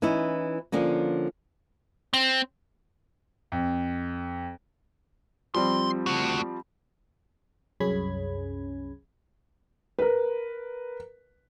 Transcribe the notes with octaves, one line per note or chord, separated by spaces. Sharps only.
E3 C#4 D#4 E4
D3 F3 A#3 C#4
C4
F2
F3 G3 C4 C6
A3 F#4
C2 F#2 C#4 G#4 B5 G#6
A#4 B4